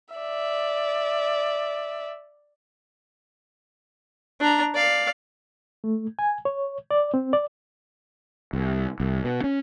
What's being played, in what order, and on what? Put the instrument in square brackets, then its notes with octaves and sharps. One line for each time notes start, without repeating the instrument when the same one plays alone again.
[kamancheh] D5 E5
[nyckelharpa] D4 A#5
D5 F5
[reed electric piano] A3
G#5
C#5
D5
C4
D5
[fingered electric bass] C2
C2
B2
C#4